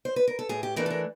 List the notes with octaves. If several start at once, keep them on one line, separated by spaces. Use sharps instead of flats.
C5
B4
A#4
A4
A2 G#4
G4
E3 A3 D4 A#4
A4
A#4